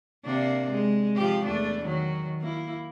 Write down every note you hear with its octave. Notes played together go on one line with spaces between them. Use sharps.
C3 A#3 D4
G#3
F3 G4
E2 A3 D4
D#3 F#3
A#3 E4